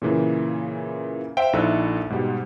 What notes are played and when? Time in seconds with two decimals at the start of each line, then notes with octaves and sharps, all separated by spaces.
0.02 A#2 C#3 E3 A#3
1.37 C5 E5 F5 G5
1.53 A#1 D#4 E4 A4 E6 F#6
2.10 G#2 B2 G3